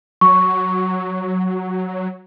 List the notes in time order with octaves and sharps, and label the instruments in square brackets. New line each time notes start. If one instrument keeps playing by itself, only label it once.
[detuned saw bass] F#3 [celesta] C#6